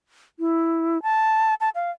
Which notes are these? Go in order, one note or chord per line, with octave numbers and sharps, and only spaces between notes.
E4
A5
A5
F5